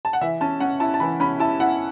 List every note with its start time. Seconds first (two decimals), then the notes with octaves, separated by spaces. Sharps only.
0.05 A5
0.13 F#5
0.21 E3 E5
0.41 C#4 A5
0.60 C#4 F#5
0.80 E4 A5
0.94 A5
1.00 E3 B5
1.20 C#4 B5
1.39 E4 A5
1.60 E4 F#5